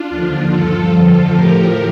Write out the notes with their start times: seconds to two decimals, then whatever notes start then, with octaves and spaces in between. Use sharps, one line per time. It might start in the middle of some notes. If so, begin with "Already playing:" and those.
Already playing: D4 F4
0.10 D#2 D3 F3
0.51 G2 F3 F4 A4
0.93 F2 D3 F3 F4 A4
1.33 A2 F3 G4 A#4